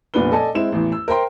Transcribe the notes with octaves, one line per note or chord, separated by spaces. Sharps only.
F1 A#2 B3 D4 B4 G7
A4 D5 D#5 G#5 A5
G#3 C4 E4 E7
A1 E2
E6
A#4 C5 E5 G5 C6